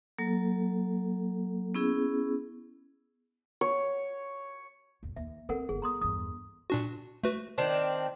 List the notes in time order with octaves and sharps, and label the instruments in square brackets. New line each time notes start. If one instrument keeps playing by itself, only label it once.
[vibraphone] F#3 A#3 A4
B3 C#4 E4 G#4
[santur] C#5
[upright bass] A#1 F2
[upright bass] D#2 [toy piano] E5
[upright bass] C4 [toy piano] A4 A#4 F#5
[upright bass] G1 G2 [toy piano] G#4
[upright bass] B3 [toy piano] A#5 C6 D#6
[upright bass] E2 G2 [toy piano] D#6
[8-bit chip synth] A#2 D4 F#4
A3 F#4 B4
[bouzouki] D#3 C4 D4